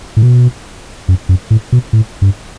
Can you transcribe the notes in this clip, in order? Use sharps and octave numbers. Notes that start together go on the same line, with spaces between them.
A2
B2
F#2
F#2
A2
B2
A2
G2